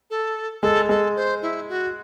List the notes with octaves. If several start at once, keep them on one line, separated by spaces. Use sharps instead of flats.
A4
G#3 A4
G#3 A4
C5
E4
F#4